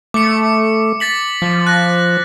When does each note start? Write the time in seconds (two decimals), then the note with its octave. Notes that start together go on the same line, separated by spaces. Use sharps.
0.14 A3 D6 C#7
1.00 A6 B6 F#7
1.42 F3
1.67 F#6 A#6